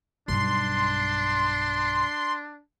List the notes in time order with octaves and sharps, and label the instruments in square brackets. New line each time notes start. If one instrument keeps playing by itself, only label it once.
[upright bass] B1 G2 [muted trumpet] D4 [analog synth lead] C6